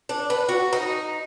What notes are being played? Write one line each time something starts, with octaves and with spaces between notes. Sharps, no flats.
D4
B4
F#4
D#4